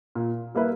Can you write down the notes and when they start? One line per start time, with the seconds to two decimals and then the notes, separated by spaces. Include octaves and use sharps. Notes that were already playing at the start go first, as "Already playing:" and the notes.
0.15 A#2
0.55 G3 A#3 E4 B4